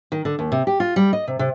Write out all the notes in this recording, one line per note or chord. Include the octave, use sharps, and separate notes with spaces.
D#3
D3
D#2
C3
G4
F4
G3
D#5
C3
C3